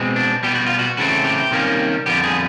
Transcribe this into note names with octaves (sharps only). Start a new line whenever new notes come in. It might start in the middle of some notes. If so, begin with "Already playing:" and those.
Already playing: B2 G#3 C4
D4
B2 G3 B3 G4
F#4
F4
F#4
C#3 E3 A3 C4 F#4
G4
C3 D#3 G3 A#3 C#4
F2 D3 G3 B3 G4
G#4